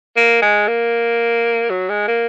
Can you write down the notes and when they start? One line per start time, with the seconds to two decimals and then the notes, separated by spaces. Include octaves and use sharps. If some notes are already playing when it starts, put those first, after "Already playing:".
0.16 A#3
0.42 G#3
0.68 A#3
1.70 F#3
1.89 G#3
2.08 A#3